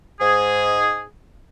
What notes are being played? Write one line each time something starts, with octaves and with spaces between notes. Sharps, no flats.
G#2 G#4